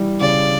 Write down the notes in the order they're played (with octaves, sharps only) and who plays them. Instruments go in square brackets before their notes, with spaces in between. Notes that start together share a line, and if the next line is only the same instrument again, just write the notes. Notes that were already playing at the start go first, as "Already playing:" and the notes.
Already playing: [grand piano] E3 G3
[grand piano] C#3 [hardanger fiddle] D5